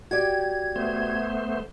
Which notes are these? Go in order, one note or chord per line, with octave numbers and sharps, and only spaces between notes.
F#4 G4 D5 G#6
A3 B3 C5